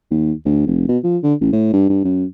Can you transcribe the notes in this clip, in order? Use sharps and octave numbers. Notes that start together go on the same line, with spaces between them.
D#2
D2
F1
B2
F3
D3
A1
A2
G2
G2
F#2